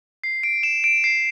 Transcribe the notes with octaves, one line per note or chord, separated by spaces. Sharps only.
C7
D7
E7
D7
C7